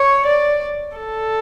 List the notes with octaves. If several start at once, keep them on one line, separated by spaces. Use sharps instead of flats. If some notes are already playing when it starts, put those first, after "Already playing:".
Already playing: C#5
D5
A4